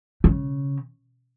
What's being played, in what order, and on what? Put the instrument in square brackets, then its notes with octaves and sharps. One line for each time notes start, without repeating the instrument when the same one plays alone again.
[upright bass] C#3